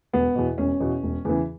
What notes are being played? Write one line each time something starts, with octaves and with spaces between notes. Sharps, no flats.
E1 B3
E2 B2
E1 C#4
E2 B2
E1
E2 C#3 E3